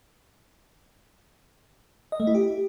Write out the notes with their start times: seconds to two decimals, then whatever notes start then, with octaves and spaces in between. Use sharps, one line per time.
2.12 D#5
2.20 A3
2.27 E4
2.35 G4